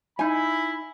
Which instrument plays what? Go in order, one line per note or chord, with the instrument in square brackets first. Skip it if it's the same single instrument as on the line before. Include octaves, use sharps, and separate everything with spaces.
[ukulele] D#4 G#5 [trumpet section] E4 B5